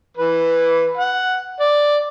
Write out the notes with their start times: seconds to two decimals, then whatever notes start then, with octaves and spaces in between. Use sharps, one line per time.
0.17 E3 B4
0.97 F#5
1.60 D5